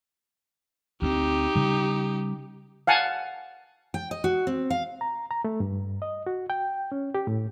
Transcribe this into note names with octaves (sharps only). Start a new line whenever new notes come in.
D2 B3 C4 D#4 G4
C#3 G3
F5 F#5 G#5 A5
G5
D#5
F#4
C4
F5
A#5
A#5
A3
G2
D#5
F#4
G5
C#4
G4
A2